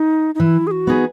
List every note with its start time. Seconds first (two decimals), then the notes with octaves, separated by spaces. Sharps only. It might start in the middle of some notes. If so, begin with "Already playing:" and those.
Already playing: D#4
0.35 D#4
0.40 E3 E4
0.67 G#4
0.71 F#4
0.87 B3 D#4 G#4 B4